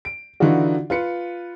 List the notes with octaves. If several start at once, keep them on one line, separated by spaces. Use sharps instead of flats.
D7
D3 E3 D4 D#4 F4 F#4
F4 B4 C#7